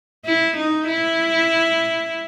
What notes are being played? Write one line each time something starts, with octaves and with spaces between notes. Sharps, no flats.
E4
D#4
E4